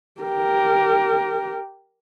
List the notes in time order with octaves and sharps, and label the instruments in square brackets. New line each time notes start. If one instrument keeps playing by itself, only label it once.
[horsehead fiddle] G4 A#4